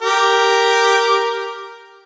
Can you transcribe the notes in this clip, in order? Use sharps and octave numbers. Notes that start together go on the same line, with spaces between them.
G4 A#4